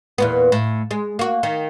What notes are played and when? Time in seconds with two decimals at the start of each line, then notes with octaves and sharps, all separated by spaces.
0.18 E2 A#2 B3
0.52 A2
0.91 G#3
1.19 A#3 F#4
1.43 D#3